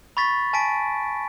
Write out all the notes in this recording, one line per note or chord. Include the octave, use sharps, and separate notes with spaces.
B5 C#6 A6 B6
G#5 A5 B6 D7